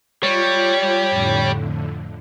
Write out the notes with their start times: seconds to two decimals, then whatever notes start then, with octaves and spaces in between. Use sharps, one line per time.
0.23 G3 F4 C#5
1.09 F2 A2 D3